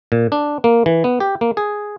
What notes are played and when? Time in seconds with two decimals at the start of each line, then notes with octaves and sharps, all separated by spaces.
0.12 A#2
0.32 D4
0.64 A#3
0.86 E3
1.04 B3
1.20 G4
1.41 A#3
1.57 G#4